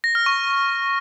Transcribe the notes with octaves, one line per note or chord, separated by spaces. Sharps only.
A#6
F6
C#6